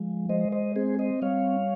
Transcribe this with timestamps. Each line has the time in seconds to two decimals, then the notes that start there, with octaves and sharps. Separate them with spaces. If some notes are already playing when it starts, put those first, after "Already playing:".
Already playing: F3 G#3
0.29 G#3 C5 D#5
0.52 C5 D#5
0.76 C4 G#4 C5
0.99 C5 D#5
1.22 G3 C#5 F5